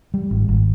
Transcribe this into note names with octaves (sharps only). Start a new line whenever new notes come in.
G3
G#1
G#1